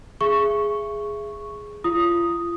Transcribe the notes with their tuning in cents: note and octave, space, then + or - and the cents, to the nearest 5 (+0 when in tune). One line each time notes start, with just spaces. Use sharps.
G#4 +0 E5 +30 C#6 +0
F4 -35 D#6 +0